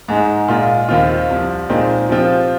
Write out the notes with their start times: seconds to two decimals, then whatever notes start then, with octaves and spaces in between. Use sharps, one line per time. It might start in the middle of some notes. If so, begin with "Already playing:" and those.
0.08 G#2 G#3 D#4
0.48 A#2 G#3 F4
0.89 D#2 D#3 C4 F4
1.29 C2 C3 F3
1.69 A#2 G#3 C4 D#4
2.09 C3 F3 C4 F4